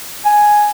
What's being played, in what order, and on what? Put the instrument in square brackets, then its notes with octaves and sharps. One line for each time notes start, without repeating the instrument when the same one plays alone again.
[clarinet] G#5